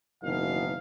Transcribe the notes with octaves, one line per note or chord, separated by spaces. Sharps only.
F#1 B2 D#3 E3 D#4 F5